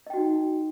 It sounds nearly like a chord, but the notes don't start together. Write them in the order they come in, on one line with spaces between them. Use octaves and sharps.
D#5 G5 F#4 D#4